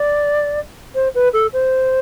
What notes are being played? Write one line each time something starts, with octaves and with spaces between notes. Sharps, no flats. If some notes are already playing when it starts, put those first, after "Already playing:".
Already playing: D5
C5
B4
A4
C5